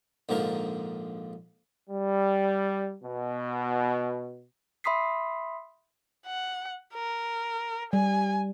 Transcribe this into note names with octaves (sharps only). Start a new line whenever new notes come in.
A#1 G#2 D3 F3 A#4
G3
B2
E5 B5 C6 D#6 B6 C7
F#5
A#4
G3 G#5